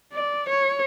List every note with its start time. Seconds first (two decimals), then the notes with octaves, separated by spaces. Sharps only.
0.13 D5
0.49 C#5